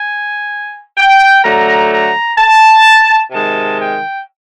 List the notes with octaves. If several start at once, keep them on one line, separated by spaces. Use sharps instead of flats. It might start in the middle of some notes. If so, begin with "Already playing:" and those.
Already playing: G#5
G5
D3 F#3 A3 A#5
A#5
A5
C3 D#3 G#3 A5
G5